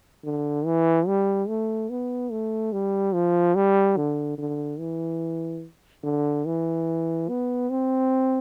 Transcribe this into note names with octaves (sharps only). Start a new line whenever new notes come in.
D3
E3
G3
A3
B3
A3
G3
F3
G3
D3
D3
E3
D3
E3
B3
C4